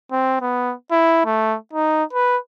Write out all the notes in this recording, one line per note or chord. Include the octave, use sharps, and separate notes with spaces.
C4
B3
E4
A3
D#4
B4